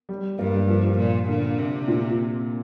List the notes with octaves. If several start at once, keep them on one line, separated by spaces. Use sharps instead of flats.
G3
G2 A#3
G3
F3
F3
A#2
A#2 D3
C3
A#2